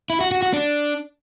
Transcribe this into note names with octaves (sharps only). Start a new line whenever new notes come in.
E4
F#4
F#4
F#4
D4